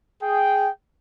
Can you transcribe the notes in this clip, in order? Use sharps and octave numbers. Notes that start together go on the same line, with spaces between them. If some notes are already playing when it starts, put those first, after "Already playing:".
G#4 G5